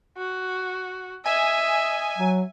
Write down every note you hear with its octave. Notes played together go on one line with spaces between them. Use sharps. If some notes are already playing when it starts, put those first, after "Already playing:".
F#4
D#5 E5 G#5
F#3